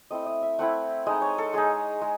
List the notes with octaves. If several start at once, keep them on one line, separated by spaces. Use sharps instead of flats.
A3 C4 E4 D#5
D#5
E5
A3 C4 E4 F#5
G#3 D#4 D#5
C#5
A4
G#3 D#4 G#4
G#3